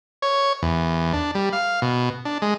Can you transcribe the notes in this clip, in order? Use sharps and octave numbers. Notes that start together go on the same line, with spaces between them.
C#5
E2
D4
G3
F5
B2
D4
G#3